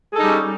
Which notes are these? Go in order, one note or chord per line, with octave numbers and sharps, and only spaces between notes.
G3 C#4 D#4 G#4 A4